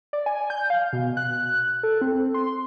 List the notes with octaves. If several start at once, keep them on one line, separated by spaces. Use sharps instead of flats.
D5
G#5
G6
F5
B2
F#6
A4
C4
C6